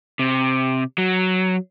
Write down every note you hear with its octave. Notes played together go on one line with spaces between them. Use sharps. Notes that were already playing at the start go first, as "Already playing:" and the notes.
C3
F#3